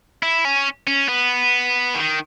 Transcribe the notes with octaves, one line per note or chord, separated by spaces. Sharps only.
E4
C#4
C#4
B3
D#3